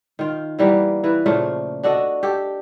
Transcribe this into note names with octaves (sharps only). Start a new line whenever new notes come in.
D#3 F4
E3 G3 A#3 B3
E3 B4
A#2 C#3 F3 A3
D4 F#4 A4 D#5
G4 A4